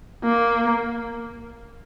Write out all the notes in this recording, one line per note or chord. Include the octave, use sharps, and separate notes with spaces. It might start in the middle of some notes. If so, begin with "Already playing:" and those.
A#3